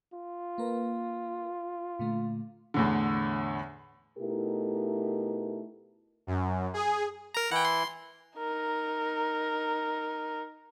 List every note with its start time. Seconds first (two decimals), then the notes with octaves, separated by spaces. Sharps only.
0.13 F4
0.58 A#3 A#4 B4
1.99 A#2 D3 A3
2.74 E2 A2 D3
4.18 B2 A3 D#4 E4 G4 A#4
6.27 F#2
6.74 G#4
7.34 A#4 A#5
7.51 E3 E4 F#5 G5
7.65 C6
8.38 D#4 A#4